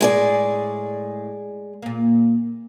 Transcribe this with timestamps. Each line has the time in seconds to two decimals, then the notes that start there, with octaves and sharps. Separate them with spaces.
0.01 A2 G#3 G#4 D5
1.82 A#2 A#3